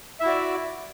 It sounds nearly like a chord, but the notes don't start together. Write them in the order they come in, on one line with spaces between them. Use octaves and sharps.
E5 E4 F#4 D5